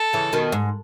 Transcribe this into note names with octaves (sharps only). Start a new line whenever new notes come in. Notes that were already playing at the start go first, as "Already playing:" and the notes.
Already playing: A4
C#3 E3
B2 D#3
G#2